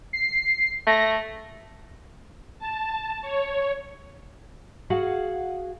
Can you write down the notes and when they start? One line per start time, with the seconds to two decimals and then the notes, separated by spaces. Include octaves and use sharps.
0.13 C7
0.87 A3 A#6
2.59 A5
3.22 C#5
4.90 F#4 G#4 F5 F#5